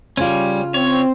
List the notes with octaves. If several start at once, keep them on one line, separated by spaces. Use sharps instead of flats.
C#3 G3 C#4 F4
C4 C#5